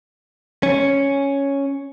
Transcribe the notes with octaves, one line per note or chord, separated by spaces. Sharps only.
C#4